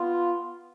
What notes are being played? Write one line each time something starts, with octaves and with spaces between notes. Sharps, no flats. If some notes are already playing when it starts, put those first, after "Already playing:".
Already playing: B3 F4